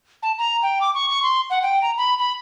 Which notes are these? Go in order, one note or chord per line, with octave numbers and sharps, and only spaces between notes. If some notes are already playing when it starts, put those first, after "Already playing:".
A5
A#5
G5
D6
C#6
C#6
C6
F#5
G5
A#5
B5
B5